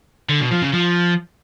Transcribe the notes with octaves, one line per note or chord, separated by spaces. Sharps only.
D3
B2
F3
C#3
F3